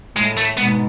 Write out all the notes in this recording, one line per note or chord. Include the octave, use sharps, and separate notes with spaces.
A2 G#3
A3
G#2 B2 B3